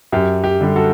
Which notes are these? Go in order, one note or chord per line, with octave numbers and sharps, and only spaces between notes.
F#2 G4
G4
D3 G3
F#4 A4